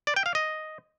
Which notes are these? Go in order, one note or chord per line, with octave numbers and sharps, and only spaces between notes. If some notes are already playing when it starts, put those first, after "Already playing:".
D5
G5
F5
D#5